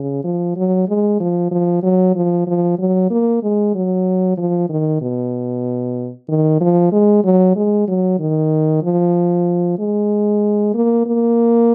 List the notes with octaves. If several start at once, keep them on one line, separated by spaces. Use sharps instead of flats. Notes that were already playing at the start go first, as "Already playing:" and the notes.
Already playing: C#3
F3
F#3
G#3
F3
F3
F#3
F3
F3
F#3
A#3
G#3
F#3
F3
D#3
B2
D#3
F3
G#3
F#3
G#3
F#3
D#3
F3
G#3
A#3
A#3